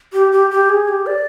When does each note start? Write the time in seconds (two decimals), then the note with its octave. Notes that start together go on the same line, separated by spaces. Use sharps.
0.13 G4
0.32 G4
0.51 G4
0.69 G#4
0.88 G4
1.06 D5